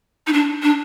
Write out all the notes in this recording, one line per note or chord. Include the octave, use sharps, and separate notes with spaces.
D#4
D4
D4